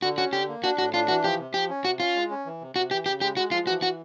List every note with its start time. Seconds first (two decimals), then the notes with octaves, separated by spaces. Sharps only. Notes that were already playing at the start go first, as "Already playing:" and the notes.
0.02 D3 F#4
0.17 C#4 F#4
0.32 D3 G4
0.48 A#3
0.63 D4 F#4
0.78 A2 F#4
0.94 D4 F4
1.08 E3 F#4
1.23 F3 G4
1.39 C3
1.54 F3 G4
1.69 C#4
1.84 C3 F#4
1.99 C#4 F4
2.16 G#3
2.30 C#4
2.46 E3
2.61 C3
2.76 C3 F#4
2.91 E3 G4
3.06 C#3 G4
3.21 G#3 G4
3.37 G#3 F#4
3.51 F3 F4
3.67 E3 F#4
3.82 F#4